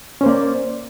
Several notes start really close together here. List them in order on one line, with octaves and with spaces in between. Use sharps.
C#4 C5 A#3 D5